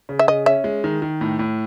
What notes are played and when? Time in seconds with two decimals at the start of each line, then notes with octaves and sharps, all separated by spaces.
0.09 C#3
0.19 E5
0.28 C#3 D#5
0.46 C#4 E5
0.64 G#3
0.84 D#3
1.02 D#3
1.21 A2
1.39 A2